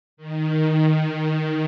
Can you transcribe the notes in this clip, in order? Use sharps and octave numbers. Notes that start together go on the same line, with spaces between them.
D#3
D#3